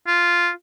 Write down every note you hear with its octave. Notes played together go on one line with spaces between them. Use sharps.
F4